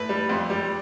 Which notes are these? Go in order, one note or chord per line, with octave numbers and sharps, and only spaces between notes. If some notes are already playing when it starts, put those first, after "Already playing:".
Already playing: A2 B4
G3
F2
G3